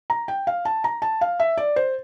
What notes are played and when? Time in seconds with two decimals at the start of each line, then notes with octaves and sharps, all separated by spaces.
0.10 A#5
0.28 G5
0.47 F5
0.65 A5
0.84 A#5
1.02 A5
1.21 F5
1.40 E5
1.57 D5
1.76 C5